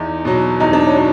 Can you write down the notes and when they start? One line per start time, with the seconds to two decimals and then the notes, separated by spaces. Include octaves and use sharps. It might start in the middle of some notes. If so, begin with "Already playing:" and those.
Already playing: E2 D#4
0.25 B2 F#3
0.60 E2 D#4
0.73 D4
0.86 C#4
0.95 B2 F#3